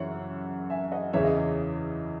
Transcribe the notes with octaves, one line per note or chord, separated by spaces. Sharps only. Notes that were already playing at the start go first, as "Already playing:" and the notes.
Already playing: F#2 C#3 E3 C#5 E5 F#5
E5 G#5
D#5 F#5
E2 C#3 E3 C#5 E5
D#5
C#5